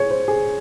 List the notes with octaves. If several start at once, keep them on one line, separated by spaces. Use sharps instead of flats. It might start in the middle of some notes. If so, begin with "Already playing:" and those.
Already playing: G#4 C#5
C5
G#4